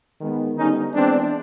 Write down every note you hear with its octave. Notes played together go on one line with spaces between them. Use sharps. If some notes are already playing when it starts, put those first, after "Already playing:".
D#3 G#3 B3
D3 G3 B3 C#4 D#4
E3 G#3 B3 C4 D4